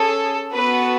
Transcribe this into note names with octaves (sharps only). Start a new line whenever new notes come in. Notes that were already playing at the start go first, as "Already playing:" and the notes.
Already playing: C#4 G#4 A4
B3 F#4 A4 B4